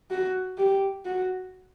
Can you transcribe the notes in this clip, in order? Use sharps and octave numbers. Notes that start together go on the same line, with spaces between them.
F#4
G4
F#4